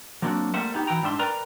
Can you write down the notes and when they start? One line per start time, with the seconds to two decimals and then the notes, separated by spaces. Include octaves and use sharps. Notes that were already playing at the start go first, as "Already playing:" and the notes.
0.22 F#3 A#3 C4 D4 F#4
0.54 G3 A3 A#3 C5 E5 F#5
0.74 B3 D#4 G4
0.87 E3 E4 F#4 G5 A#5
1.03 G#2 G3 D4 E5 C6
1.19 A#4 B4 D5 G5 A#5 C6